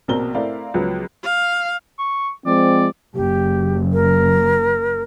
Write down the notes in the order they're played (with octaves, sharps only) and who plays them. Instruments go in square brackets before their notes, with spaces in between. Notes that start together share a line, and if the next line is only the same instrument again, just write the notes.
[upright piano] A#1 B2 C4 A#4 G7
A3 C4 E4 A#4 D5 F5
C#2 F3 F#3 B3
[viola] F5
[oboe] C#6
[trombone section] F3 G#3 C4 [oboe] D5
[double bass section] F#1 [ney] G4
[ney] A#4